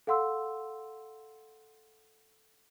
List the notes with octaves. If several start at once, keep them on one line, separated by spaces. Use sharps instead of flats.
A4 F5 F#5 C6 E6